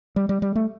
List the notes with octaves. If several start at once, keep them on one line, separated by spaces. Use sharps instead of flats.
G3
G3
G3
A3